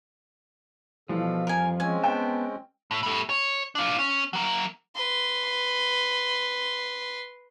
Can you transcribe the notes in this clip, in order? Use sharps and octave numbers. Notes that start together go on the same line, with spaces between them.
B2 E3 F3 G3 A4 F5
F2 A#4 G#5
G#3 C4 C#4 G#5
B3 G5 A5
A2
G3 A3
C#5
D4 F4
C#4
F#3 A#3
B4 C6